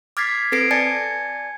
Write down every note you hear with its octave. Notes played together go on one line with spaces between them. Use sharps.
D6 F6 G#6 A6 B6 C7
C4 A4 B4 A#6 C7 D7
D5 G#5 A5 G#6 A6 C#7